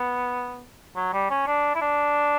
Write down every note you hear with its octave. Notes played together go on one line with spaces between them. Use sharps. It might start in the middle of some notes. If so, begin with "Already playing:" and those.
Already playing: B3
F#3
G3
C#4
D4
E4
D4